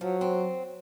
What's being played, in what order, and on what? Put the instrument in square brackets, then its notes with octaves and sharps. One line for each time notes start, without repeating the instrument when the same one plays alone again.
[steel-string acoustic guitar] F3 [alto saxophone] F#3
[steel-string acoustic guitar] C4